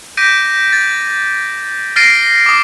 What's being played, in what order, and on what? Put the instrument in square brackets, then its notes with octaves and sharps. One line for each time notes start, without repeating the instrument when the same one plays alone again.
[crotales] D6 G6 A#6 B6 D7 D#7
A6
F6 A6 A#6 C7 D7 D#7
D6 D#6